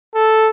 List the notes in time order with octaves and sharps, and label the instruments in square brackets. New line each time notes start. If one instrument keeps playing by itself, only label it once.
[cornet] A4